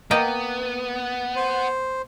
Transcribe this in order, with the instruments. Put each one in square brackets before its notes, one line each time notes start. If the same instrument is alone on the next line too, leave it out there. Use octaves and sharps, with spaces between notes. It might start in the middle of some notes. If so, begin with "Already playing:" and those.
[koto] A#3 D#5 G5 [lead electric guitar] B3
[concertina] C5